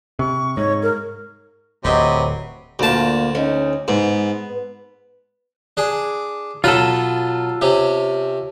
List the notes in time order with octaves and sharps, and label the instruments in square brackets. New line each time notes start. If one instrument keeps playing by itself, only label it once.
[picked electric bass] C3 [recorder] C#6
[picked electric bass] G#2 [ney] C#5
[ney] A#4
[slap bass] D1 [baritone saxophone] C3 [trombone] F#3 [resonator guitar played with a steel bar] B4 D#5
[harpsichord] D2 A5 [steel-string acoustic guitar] A#2 A#3
[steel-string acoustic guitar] C#4 D#4
[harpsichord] G#2 [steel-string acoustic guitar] B3
[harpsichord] D4 G#4
[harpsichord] B2 F#3 B4 [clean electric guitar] F4 A4
[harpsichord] C3 C#4